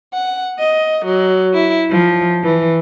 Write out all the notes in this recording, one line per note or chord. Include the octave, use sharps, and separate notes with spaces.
F#5
D#5
F#3
E4
F3
E3